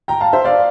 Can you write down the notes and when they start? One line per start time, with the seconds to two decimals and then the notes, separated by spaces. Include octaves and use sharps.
0.08 G5 A#5
0.21 F5 A5
0.33 C5 E5
0.45 D5 F5